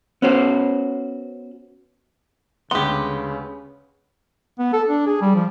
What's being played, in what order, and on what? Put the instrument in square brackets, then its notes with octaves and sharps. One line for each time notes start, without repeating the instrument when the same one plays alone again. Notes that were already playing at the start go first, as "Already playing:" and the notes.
[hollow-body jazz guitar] B3 C#4 F#4 C5
[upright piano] D2 G#3 F#5 [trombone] C#3 [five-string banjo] B3 G4 [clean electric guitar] C6
[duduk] B3
A4
D4
G#4
G3
F3